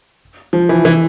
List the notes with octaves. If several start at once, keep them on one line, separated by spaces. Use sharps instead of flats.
F3
E3
E3